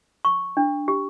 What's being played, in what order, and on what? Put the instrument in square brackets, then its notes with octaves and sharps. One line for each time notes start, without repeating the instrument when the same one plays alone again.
[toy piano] C#6
D4
G4